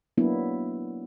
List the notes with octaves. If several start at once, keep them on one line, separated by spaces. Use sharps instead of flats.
F#3 A#3 B3 D4 E4